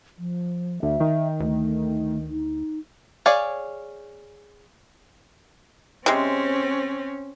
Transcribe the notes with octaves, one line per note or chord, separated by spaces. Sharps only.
F3
D2 E5
D#3
D2 A3
D#4
G#4 C#5 D5 F5 G#5
C3 G#3 C4 C#4